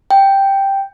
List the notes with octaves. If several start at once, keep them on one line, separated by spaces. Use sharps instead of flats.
G5